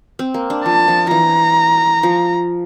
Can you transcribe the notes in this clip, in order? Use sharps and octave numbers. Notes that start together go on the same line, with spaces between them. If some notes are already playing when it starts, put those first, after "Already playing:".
C4
A#3
D4
F3 A5
F3
E3 F3 A#5
F3